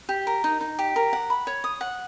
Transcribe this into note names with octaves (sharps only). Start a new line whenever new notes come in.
G4
A#4
D#4
D#4
G4
A#4
F#5
B5
C#5
D#6
F#5